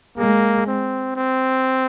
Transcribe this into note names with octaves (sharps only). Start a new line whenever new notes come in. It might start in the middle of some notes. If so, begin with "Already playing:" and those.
G#3 A#3
C4
C4